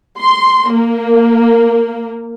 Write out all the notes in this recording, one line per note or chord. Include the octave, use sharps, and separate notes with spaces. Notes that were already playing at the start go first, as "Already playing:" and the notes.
C6
A#3